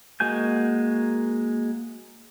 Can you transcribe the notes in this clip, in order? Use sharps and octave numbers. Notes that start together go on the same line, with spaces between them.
G#3 A#3 F#4 G#5 G6